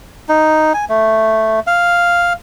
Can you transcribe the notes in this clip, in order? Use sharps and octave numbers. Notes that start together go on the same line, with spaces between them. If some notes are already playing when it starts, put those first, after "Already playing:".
D#4
G#5
A3
F5